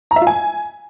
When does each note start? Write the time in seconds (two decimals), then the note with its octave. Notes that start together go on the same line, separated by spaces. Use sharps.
0.11 A#5
0.16 E5
0.22 F4
0.27 G#5